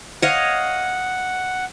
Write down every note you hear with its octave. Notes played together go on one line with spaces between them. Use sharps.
C#5 D#5 F5 F#5